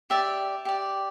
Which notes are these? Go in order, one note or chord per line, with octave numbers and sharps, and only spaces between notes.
G4 D5 E5
G4 D5